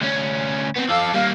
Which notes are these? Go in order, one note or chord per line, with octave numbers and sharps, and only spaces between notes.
D2 C#4
B3 C4
F3 A4 F5 D6 E6
G3 A#3 F5 F6